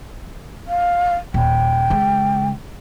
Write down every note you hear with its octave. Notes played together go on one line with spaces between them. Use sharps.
F5
D#1 G5
C#3 G#3